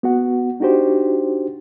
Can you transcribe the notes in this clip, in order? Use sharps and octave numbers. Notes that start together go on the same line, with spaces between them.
B3 F#4 F#5
D4 D#4 F#4 G4 C5